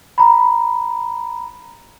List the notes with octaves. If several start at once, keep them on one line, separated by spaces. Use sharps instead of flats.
A#5 B5